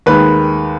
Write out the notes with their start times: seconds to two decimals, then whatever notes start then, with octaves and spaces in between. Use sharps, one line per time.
0.06 D#2 D#3 G#3 B4